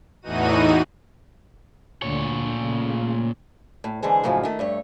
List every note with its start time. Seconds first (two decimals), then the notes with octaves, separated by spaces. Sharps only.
0.22 E2 A2 E3 D#4 F#4 D#7
2.02 D2 A#2 D3 C#5
2.59 C#3 A3 A#3
3.84 A2
4.02 D3 E3 G#3 G#4 C5
4.23 F#2 A2 C#3 F3 G#3
4.43 D#3 A3
4.59 G2 A3 C#5